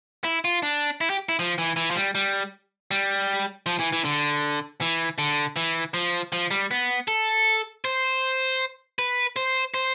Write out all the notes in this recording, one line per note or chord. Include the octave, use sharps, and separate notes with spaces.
E4
F4
D4
E4
G4
E4
F3
E3
E3
F3
G3
G3
G3
F3
E3
E3
D3
E3
D3
E3
F3
F3
G3
B3
A4
C5
B4
C5
C5